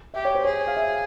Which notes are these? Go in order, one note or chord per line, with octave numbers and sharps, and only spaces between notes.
G4 E5
C#5
C5
G#4 C#5
F5
E5